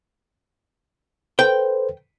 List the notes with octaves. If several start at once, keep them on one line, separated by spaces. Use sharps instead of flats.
A4 B4 C5 G5